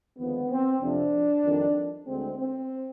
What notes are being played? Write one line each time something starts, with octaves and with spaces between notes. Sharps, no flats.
D#2 D3 F3 G#3 B3
C4
F2 C3 F3 D4
F2 D#3 G3
D2 D3 G#3 C4
C4